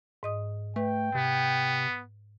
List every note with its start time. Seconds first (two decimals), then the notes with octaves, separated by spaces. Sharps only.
0.23 G#2 D#5 D#6
0.76 A3 B4 G5
1.15 C3 B3